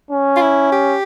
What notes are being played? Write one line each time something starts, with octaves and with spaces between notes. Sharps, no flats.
C#4
F4
E4
G4